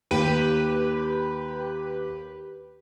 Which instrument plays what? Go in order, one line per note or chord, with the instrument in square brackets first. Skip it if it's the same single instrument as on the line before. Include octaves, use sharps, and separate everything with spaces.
[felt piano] D#2 D#7 [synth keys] G4 B4